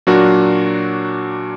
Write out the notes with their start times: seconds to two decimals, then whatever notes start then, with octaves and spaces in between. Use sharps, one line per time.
0.07 A#2 F#3 D4 F#4 A#4